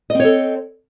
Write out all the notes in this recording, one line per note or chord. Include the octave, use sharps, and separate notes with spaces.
C4 A4 C#5 D#5